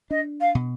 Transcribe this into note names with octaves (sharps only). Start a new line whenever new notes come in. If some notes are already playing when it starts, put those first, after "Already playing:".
D4 D#5
F5
B2